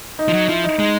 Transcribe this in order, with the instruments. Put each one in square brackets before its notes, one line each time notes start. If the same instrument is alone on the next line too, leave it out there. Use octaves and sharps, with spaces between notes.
[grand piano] D#4
[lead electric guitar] F3
F#3
[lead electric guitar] F3 [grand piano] E4
[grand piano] D#4
[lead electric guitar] G#3 [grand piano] D#4